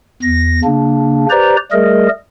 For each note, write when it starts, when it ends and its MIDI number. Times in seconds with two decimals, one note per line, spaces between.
0.22 0.60 40
0.22 0.60 94
0.64 1.26 49
0.64 1.26 58
0.64 1.26 62
1.30 1.56 67
1.30 1.56 71
1.30 1.56 72
1.30 1.56 74
1.30 1.56 82
1.72 2.08 55
1.72 2.08 57
1.72 2.08 68
1.72 2.08 70
1.72 2.08 75